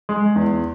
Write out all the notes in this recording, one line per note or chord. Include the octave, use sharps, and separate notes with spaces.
G#3
E2